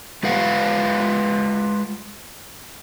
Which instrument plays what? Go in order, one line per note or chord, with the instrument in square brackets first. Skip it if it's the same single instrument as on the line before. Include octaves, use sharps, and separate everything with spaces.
[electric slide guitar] G#3 F4 B4 F5 F#5